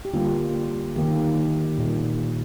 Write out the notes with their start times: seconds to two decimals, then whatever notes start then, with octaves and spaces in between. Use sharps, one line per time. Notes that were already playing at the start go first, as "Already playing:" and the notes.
0.05 G4
0.14 D3 G3 A#3 F4
0.96 D#3 A#3 G4
1.78 A#2 G3 A#3